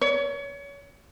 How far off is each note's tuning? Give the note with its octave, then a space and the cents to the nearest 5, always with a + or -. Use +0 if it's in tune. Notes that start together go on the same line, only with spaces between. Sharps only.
C#5 +30